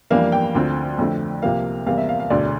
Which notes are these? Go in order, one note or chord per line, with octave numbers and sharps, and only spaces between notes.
F2 E3 G3 A#3 D4 F5
G5
D2 D3 F3 C4
F2 D3 A3 C4
C2 C3 F3 A#3 F5
E2 C3 G3 A#3 F5
E5
F5
F5
E1 D2 D3 A3 D5